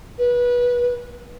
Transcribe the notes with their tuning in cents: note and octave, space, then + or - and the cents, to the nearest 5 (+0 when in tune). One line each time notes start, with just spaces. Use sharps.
B4 -25